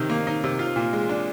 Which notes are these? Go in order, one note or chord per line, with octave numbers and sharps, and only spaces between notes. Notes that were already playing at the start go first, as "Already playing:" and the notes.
Already playing: C3 D#3 D#4
A#3
D#4
C3
F4
A#2
G#3
D4